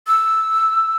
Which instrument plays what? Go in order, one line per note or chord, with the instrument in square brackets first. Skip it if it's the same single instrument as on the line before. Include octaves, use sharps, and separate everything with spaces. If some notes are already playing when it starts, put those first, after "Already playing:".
[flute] E6